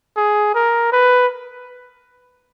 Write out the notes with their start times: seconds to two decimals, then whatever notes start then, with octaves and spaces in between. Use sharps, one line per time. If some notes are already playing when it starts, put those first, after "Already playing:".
0.17 G#4
0.55 A#4
0.92 B4